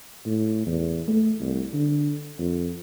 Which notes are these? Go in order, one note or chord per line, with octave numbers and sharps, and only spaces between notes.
A2
E2
A3
C2
D3
F2